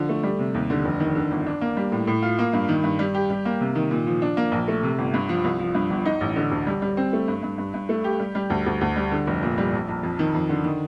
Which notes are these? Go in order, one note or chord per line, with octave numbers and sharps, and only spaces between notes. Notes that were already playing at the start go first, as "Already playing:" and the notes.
Already playing: D3 F3
A3
G3
C3
D#2
D3
F1
D#3
D3
G1
D4
A#3
G3
A2
A2
F4
A#3
G2
D#3
G2
G3
G4
G3
A#3
C3
D#3
A#2
F3
D4
A#3
A#1
A3
C3
G1
G2
F3
C2
F3
G2
G1
D#4
A1
D3
D2
G3
G3
C4
A3
G2
G2
G2
G2
A3
G4
G3
G3
D2
D2
D2
G3
D3
F1
A#2
G3
A#1
A#1
F2
D#3
F2
D3
D#3